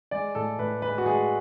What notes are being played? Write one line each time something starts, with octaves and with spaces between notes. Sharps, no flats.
G#3 D5
A2 A4
A2 B4
G#3 B4
F#4
G#3 G#4